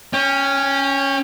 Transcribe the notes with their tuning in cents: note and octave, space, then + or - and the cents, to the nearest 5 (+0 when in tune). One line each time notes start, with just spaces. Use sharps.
C#4 +0 G5 +35